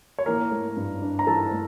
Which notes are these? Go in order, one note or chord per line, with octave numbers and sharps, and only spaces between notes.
C#5
E3 A#3 A#4
A3
G2
D4
A#5
E3 A4 A5
A3